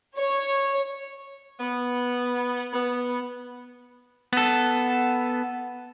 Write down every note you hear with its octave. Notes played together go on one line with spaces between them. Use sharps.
C#5
B3
B3
B3 A4